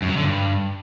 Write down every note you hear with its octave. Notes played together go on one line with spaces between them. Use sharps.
F#2
F#3
D3
G2